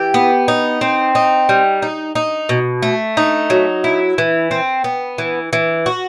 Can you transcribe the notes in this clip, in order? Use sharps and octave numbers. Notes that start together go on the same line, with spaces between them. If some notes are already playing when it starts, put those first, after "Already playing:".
Already playing: E3 G4
B3
D#4
C4
D#4
G3
D#4
D#4
B2
A3
D#4
F#3
E4
E3
C4
B3
E3
E3
F#4